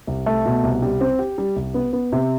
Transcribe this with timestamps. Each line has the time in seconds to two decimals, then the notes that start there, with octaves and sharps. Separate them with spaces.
0.07 C2
0.26 A3
0.46 B2
0.64 C2
0.82 G3
1.01 C4
1.19 G4
1.38 G3
1.56 C2
1.74 B3
1.93 B3
2.12 C3